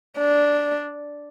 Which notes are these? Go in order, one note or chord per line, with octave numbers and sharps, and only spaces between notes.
D4